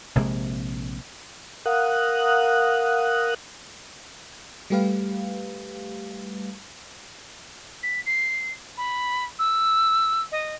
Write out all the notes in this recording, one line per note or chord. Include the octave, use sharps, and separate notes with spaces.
A#1 C3 G#3 A#3
A#4 F5 F#5 D#6 F#6
G3 A3 G4 B4 F5
B6
C7
B5
E6
D#5